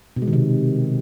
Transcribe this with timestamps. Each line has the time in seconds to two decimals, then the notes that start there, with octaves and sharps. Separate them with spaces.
0.16 B2
0.22 G#3
0.27 D#3
0.33 C3